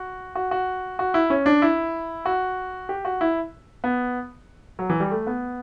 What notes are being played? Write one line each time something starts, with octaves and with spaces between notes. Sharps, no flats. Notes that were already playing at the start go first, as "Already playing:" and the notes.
Already playing: F#4
F#4
F#4
F#4
E4
C#4
D4
E4
F#4
G4
F#4
E4
B3
F#3
E3
G3
A3
B3